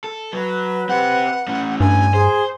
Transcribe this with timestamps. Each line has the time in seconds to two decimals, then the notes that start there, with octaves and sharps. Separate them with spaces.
0.04 A4
0.33 F#3 B4
0.89 C4 G4 F#5
1.48 A2 C#4
1.80 G2 G#5
2.14 G#4 C5